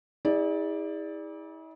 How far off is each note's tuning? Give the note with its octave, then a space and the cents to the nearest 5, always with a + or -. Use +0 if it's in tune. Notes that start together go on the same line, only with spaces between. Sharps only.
E4 -45 G#4 -30 D5 +0